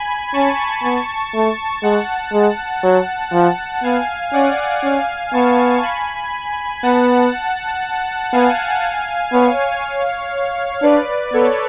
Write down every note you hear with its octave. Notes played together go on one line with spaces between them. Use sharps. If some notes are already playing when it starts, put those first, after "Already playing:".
Already playing: G#5 B5
C#4 A5 C#6
B3
A3
G#3 F#5 A5
G#3
F#3
F3
B3 F5 G#5
C#4 D5 F#5
C#4 F5 G#5
B3 A5 C#6
G#5 B5
B3 F#5 A5
B3 F5 G#5
B3 C#5 F5
D4 B4 D5
B3 A4 C#5